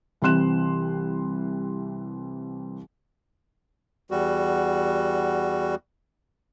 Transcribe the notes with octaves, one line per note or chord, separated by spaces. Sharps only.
C2 E3 C4 C6 F#6 E7
E2 G3 F#4